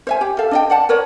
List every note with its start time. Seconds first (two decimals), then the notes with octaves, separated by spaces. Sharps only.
0.07 C5 E5 G#5
0.21 G4
0.38 A4 E5 F5
0.51 D4 D#5 G5
0.70 D5 F#5 A5
0.89 A#4 B4 C#5 D5